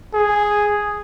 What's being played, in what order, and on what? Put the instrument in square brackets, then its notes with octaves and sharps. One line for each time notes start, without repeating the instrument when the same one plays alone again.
[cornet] G#4